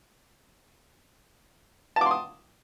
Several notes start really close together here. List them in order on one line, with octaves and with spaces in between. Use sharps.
A5 D6 C6 D#6